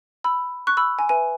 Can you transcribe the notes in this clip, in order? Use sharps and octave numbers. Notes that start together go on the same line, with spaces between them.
B5 E6
C#6 F#6
B5 E6
G#5
B4 E5 G#5